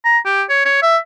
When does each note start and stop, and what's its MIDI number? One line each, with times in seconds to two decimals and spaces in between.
0.05 0.18 82
0.26 0.43 67
0.49 0.64 73
0.65 0.82 73
0.82 0.98 76